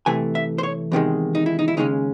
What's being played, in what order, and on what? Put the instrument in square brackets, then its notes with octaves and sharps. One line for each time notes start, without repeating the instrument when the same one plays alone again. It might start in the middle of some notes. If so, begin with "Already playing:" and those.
[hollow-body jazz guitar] C3 E3 A3 G#5
E5
C5
C#5
E2 C3 D#3 G#3
D#4
E4
D#4
E4
D#2 C#3 G#3 C#4 D#4